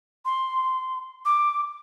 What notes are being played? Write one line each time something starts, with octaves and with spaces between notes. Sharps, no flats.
C6
D6